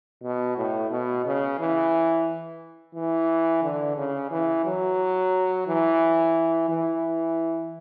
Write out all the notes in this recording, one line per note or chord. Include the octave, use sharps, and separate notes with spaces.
B2
A2
B2
C#3
E3
E3
D3
C#3
E3
F#3
E3
E3